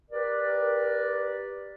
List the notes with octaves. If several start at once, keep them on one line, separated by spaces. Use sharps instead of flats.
G4 A#4 B4 D5